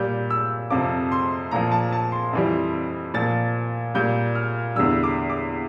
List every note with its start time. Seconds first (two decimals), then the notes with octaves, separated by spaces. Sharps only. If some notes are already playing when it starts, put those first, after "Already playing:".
Already playing: A#2 G3 G6
0.30 E6
0.70 F2 C3 F3 D6
1.12 C6
1.51 A#2 F3 A#5
1.72 A5
1.92 A5
2.12 C6
2.33 F2 E3 G3
3.14 A#2 F3 A6
3.94 A#2 G3 G6
4.35 F6
4.76 E2 D3 G3 E6
5.04 D6
5.30 D6